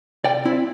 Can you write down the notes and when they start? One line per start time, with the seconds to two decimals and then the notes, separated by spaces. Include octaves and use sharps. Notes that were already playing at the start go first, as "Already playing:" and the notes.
0.24 C3 D5 G5
0.45 C4 E4